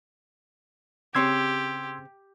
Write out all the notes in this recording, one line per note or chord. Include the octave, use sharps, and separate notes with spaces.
C#3 C4 G4 C#5 C6 E6 G#6